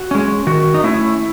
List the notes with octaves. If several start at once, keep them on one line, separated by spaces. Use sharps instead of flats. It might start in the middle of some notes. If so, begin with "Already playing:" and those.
Already playing: F#4
G#3 C#4
D#3 F#4
D#4
A3 C#4 E4